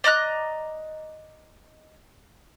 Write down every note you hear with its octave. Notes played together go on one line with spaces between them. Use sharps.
D5 D#5 A#5 F#6